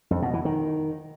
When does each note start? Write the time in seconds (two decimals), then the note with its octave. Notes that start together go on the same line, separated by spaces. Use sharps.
0.11 F2
0.22 B2
0.34 E3
0.45 D#3